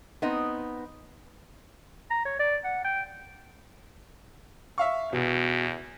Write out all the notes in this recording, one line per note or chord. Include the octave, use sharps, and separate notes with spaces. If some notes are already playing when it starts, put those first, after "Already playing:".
B3 C4 D#4 D#5
A#5
C#5
D5
F#5
G5
E5 F5 C#6
E2 B2